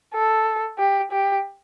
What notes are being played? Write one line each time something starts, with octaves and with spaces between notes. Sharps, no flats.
A4
G4
G4